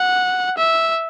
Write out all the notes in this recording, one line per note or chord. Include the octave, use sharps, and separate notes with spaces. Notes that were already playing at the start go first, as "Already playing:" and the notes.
Already playing: F#5
E5